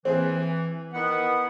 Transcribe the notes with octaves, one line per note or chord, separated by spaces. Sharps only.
E3 C4 G#4
D#3 B3 E4 B4 F#5